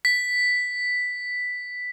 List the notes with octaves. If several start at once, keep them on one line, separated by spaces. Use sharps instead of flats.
B6